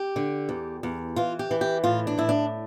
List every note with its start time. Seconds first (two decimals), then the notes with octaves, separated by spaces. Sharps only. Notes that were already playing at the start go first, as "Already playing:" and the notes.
Already playing: G4
0.16 D3
0.49 E2
0.83 E2
1.16 E3 F4
1.39 G4
1.51 E3
1.61 G4
1.84 A2 F4
2.07 D4
2.18 A2 E4
2.29 D4